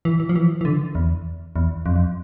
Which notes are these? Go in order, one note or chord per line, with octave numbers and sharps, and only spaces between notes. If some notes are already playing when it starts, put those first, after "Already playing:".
E3
E3
F3
E3
E3
D3
E2
E2
F2
F2